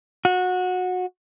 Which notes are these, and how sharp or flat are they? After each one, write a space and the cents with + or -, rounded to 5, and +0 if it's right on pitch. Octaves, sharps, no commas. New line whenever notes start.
F#4 -20